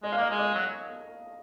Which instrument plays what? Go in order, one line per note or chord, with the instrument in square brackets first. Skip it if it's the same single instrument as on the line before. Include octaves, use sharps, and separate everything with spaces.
[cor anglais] G#3 [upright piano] D#5
[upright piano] F5
[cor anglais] A#3 [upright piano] D#5
[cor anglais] G#3
[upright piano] D#5
[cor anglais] F#3